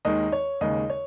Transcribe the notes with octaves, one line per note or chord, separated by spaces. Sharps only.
D#2 D#3 G#3 D#5
C#5
D#2 C#3 G#3 D#5
C#5